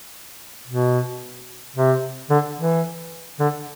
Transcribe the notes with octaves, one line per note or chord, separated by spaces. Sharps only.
B2
C3
D3
E3
D3